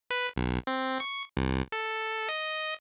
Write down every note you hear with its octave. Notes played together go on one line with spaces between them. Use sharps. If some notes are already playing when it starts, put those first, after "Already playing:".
B4
B1
C4
C#6
C2
A4
D#5